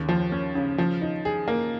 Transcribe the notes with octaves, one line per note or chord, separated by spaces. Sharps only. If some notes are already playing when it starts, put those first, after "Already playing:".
Already playing: D#2 C#3
F3
C#4
C#3
F3
D#4
G#4
A#3